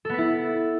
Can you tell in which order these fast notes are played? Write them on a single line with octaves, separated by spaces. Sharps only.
A4 B3 B4 E4